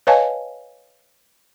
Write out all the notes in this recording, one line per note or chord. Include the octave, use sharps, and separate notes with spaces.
B4 C#5 D#5 F5 G#5 A5